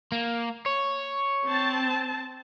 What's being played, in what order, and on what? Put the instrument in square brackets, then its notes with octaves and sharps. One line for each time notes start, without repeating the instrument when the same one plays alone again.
[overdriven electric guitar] A#3
C#5
[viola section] C4 A5